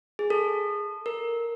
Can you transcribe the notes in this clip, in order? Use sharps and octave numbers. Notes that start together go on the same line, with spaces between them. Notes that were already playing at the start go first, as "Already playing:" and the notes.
G#4
A4
A#4